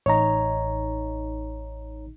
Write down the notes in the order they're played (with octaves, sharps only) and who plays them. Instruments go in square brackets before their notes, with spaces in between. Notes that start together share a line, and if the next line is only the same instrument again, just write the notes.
[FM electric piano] A1 D#4 [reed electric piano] C#5 A#5